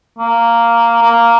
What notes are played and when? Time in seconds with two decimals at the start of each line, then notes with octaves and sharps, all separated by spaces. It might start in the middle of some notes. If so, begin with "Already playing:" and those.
0.18 A#3
1.02 A#3